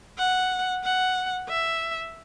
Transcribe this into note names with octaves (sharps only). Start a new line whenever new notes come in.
F#5
F#5
E5